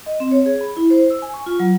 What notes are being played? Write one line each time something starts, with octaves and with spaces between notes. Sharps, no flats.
D#5
C4
C#5
G#4
B5
E4
C5
E6
G#5
C#6
F4
F#3